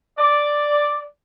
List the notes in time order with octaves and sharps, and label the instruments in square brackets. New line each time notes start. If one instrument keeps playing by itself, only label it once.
[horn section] D5